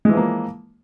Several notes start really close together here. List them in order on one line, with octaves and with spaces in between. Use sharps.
G#3 E3 F3 A#3